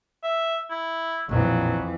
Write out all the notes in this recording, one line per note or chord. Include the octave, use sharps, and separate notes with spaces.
E5
E4
A#1 F2 B2 E3 F#3